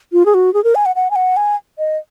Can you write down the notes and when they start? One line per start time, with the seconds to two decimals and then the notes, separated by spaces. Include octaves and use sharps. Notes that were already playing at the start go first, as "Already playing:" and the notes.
0.13 F4
0.26 G#4
0.34 F#4
0.54 G#4
0.64 A#4
0.75 G#5
0.86 F#5
0.96 F#5
1.11 G#5
1.16 F#5
1.37 G#5
1.78 D#5